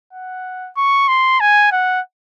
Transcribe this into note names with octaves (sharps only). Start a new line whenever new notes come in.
F#5
C#6
C6
G#5
F#5